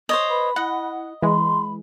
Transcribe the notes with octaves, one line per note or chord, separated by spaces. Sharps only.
C5 C#5 D#5
B4 B5
E4 D#5 F#5
E3 G#3 B5 C6